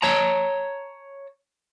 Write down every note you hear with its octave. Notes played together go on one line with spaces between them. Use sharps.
C#5 A5 A#5